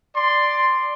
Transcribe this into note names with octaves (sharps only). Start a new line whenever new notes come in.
D5 C6